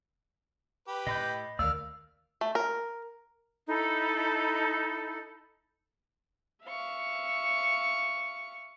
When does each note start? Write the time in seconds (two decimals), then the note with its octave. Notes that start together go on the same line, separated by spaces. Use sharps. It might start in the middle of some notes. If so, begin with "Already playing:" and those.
0.88 G4 B4
1.07 A2 D#5 B5 G6
1.59 D2 D#3 A3 A#4 D5 F5 E6
2.41 A3
2.55 A#4
3.68 D#4 E4 A4 B5
6.64 E5 F5 C#6